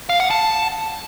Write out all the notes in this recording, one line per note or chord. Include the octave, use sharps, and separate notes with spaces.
F5
F#5
A5